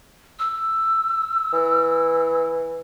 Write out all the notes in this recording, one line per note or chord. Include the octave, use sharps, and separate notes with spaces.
E6
E3